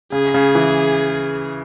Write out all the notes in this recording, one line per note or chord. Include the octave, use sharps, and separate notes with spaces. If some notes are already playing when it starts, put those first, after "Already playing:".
C#3 G#4
C#3
E3